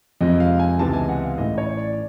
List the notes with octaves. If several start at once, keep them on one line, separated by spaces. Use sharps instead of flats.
F2 C3 F3 G#3 D#5
F5
G#5
C#2 C3 E3 G#3 B3 A5
G#5
F#5
F5
A1 A2 E3 A3 D#5
C#5
D5
D5